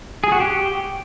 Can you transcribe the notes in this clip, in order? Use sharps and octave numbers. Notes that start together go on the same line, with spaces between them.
G#4
F#4
G4